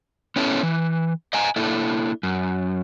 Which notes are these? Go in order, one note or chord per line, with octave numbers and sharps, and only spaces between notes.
B3 C#4 E4 A4
E3
D#5 F5 G#5 A#5
A#3 D4 E4 A4
F#2